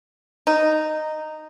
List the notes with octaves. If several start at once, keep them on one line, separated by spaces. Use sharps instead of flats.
D#4